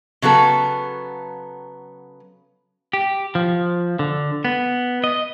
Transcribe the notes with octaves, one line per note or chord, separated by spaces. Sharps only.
C#3 F#3 B3 A4
G4
F3
D3
B3
D#5